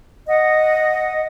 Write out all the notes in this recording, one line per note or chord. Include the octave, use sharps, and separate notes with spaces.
D#5 F#5